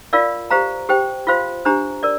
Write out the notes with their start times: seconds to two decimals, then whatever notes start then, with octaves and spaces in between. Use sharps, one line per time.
0.13 F4 A#4 D5 F5
0.50 G4 C5 F5 A#5
0.89 G4 C5 G5
1.27 F4 C5 F5 C6
1.65 D4 G4 C5 A#5
2.03 A#4 D5